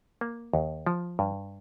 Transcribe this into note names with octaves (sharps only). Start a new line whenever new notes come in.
A#3
D#2
F3
G2